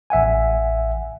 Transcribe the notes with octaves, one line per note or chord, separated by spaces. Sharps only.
A1 E5 F#5 G#5